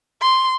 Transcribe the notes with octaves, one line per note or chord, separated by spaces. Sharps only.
C6